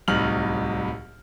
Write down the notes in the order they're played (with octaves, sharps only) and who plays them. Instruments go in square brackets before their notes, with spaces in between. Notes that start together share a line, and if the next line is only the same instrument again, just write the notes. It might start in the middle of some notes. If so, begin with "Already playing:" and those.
[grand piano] D1 C2 A2 D#4 F6 F#7